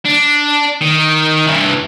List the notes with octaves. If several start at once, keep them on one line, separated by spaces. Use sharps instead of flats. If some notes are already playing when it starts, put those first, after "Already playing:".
D4
D#3
G2 E3